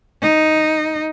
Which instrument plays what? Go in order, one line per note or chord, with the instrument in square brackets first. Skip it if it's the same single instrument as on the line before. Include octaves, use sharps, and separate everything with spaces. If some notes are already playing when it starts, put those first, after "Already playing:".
[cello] D#4